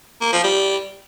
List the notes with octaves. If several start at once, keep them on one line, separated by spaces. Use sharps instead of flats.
A#3
F3
G3